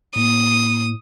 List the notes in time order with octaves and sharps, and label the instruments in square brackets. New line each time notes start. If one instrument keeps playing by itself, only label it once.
[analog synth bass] A2 [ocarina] A#3 [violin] D#6